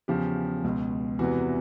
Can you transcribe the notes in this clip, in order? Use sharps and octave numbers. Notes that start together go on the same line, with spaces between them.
E2 C#3 F3 G4
C#2 B2
E2 C3 E3 F#4